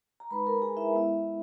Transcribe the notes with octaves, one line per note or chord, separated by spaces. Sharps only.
A#5
G#3 D#4 B4 B5
A#4 A#5
G#4 G#5
E4 E5
G#3 B3 E4